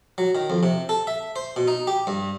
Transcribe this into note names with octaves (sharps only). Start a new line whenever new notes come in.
F#3
D#3
F2
C3
A4
E5
C5
B2
D#4
G4
G2